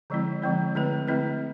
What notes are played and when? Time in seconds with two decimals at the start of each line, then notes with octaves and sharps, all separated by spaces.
0.10 D3 F3 G#3 C4 E4
0.42 D3 F3 G#3 C4 E4
0.75 D3 A3 C4 E4 B4
1.08 D3 A3 C4 E4 B4